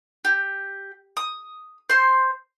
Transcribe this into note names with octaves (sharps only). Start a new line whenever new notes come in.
G4
D#6
C5 C6